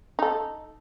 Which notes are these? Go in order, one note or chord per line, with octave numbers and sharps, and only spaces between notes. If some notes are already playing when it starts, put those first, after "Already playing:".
D#4 A4